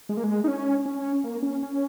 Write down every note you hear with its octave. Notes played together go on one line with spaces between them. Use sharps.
G#3
A#3
G#3
D#4
C#4
C#4
A#3
C#4
C#4